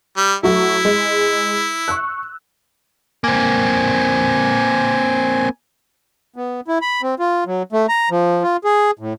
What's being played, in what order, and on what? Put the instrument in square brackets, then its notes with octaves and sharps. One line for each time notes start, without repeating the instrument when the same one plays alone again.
[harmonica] G3
[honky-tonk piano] F#3 A3 F#4 [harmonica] E4
[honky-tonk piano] G#3
C#6 E6 F#6
[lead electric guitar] A#3 C4 [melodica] G#5
[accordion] B3
E4
B5
C4
F4
F#3
A3
A#5
F3
F4
G#4
A2